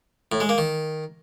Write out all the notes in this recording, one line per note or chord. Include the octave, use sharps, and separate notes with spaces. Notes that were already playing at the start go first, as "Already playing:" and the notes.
A2
G#3
A#3
D#3